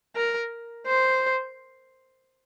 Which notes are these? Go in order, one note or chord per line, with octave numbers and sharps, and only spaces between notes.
A#4
C5